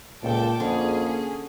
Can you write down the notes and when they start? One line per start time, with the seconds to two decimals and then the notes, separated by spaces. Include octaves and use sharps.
0.23 C#2 A#2 A4 G5 D6
0.60 F2 D3 A#3 C#4 G#4